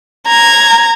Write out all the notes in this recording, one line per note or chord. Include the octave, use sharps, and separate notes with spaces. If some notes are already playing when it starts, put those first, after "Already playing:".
A#5 G#6